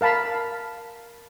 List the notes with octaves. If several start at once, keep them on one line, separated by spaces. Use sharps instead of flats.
A#4 F5 A5 B5